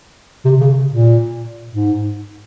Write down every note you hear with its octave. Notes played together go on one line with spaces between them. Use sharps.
C3
C#3
A#2
G#2